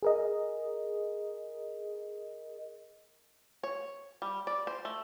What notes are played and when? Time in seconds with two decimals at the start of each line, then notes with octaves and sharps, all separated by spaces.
0.03 G#4 A#4 D#5
3.63 C#5
4.22 G3
4.47 D5
4.67 C5
4.85 A3